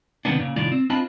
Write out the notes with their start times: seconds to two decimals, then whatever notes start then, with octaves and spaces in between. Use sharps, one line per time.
0.25 C3 D#3 F3 A#3 B3 D4
0.39 A#2 C#3
0.56 C2 A2 D#3 D4 F4 D5
0.72 C4
0.90 C4 D4 F4 D#5 A5 B5